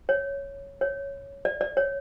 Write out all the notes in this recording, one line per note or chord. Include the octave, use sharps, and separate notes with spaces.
C#5
C#5
D5
D5
C#5